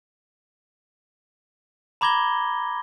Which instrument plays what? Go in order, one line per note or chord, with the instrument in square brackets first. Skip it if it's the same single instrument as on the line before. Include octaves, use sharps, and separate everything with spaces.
[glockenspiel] A#5 B5 D6 G#6 A#6 G7